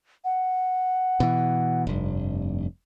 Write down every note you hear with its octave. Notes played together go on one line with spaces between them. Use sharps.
F#5
B2 E3
F1 G2